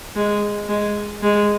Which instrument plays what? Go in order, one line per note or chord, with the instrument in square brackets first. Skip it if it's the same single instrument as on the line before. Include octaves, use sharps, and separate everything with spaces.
[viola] G#3
G#3
G#3